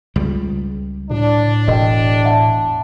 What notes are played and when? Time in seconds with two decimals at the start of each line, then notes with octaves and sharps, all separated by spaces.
0.16 C#2 G3
1.11 A2 D4
1.68 E1 D#5 G5
2.25 E5 F#5 A5